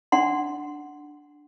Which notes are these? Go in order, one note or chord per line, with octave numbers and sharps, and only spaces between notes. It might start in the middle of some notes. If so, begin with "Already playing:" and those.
D4 F#5 C6